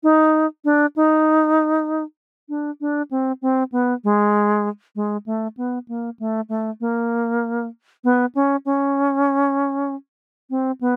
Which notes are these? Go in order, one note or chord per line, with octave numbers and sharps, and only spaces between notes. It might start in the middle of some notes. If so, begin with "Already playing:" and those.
D#4
D4
D#4
D4
D4
C4
C4
B3
G#3
G#3
A3
B3
A#3
A3
A3
A#3
B3
C#4
C#4
C4
B3